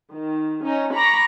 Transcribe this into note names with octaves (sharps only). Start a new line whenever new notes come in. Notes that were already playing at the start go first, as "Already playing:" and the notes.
D#3
C#4 D#4
A#5 B5 C#6 D6 A#6